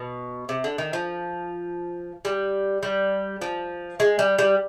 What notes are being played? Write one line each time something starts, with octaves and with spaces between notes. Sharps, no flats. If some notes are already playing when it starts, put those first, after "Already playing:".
Already playing: B2
C3
D3
D#3
F3
G3
G3
F3
G#3
G3
G3